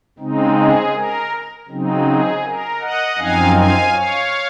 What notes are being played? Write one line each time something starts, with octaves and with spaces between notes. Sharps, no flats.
C#3 G#3 C4 D#4
G#4
A#4
C#3 F#3 C4 D#4
G#4
A#4
D#5 F#5
F#2 F3 C4 D#4 F5 G#5
F5 G#5
C#5 F5